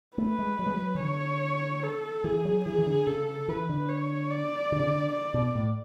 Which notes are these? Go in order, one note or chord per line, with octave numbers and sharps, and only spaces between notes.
A3 B4
G#3
F#3
G#3
F#3
E3
D3 C#5
A4
E3 G#4
F#3
E3 G#4
E3
D3
C#3 A4
E3 B4
D3
C#5
D5
D3
C#3
D3
D5
B2
A2